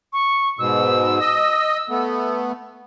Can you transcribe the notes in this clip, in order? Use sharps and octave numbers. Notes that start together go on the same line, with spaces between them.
C#6
G#2 B2 E6
D#5
A3 B3